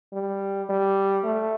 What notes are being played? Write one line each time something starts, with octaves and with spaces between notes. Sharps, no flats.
G3
G3
A3